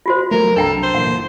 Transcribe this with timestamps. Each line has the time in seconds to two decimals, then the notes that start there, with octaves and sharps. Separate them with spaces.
0.06 F4 F#4 C5
0.31 F#3 A3 A#4
0.56 C2 F#2 D4 A4 G5 A#5
0.83 C5
0.95 A#2 E3 F#5
1.11 F#1